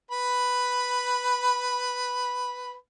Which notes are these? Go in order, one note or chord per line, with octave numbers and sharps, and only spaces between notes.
B4 B5